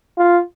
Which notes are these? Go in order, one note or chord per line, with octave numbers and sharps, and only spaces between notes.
F4